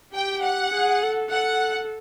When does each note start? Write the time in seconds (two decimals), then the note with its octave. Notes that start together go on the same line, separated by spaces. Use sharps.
0.14 G4 G5
0.43 F#5
0.73 G#4
1.03 A4
1.32 A4 F#5